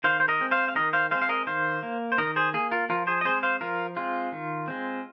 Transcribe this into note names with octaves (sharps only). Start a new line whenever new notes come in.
D#3 C5 F5
C5
A#4 D#5
G#3 C4
C5 F5
F5
D#3 A#4 D#5
C5 F5
G#3 C4 C5 F5
F5
A#4 D#5
D#3 C5 F5
A#3
C5
D#3 A#4 D#5
G#4 C5
A#3 G#4
F4 A#4
F3 F4 A#4
G#4 C5
D#5
G#3 C4 G#4 C5
C5 F5
F3 F4 A#4
G#3 C4 F4
D#3
G#3 C4